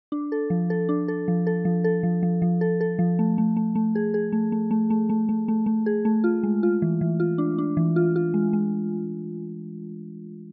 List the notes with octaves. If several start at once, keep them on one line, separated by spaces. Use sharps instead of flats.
D4
A4
F3
A4
D4
A4
F3
A4
F3
A4
F3
F3
F3
A4
A4
F3
A3
A3
A3
A3
G#4
G#4
A3
A3
A3
A3
A3
A3
A3
A3
G#4
A3
F4
G#3
F4
E3
E3
F4
D4
D4
E3
F4
F4
G#3
G#3